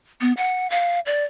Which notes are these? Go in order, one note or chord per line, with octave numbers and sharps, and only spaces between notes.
B3
F#5
F5
D5